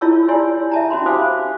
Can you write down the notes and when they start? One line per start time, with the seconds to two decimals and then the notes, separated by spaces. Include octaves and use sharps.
0.01 E4 F4 C#5 A5 C#6 E6
0.28 E4 G4 C#5 D5 G#5 C6
0.71 E5 A5 A#5
0.90 C#4 F#4 B5 C6
1.06 G4 C5 F5 G#5 D6 D#6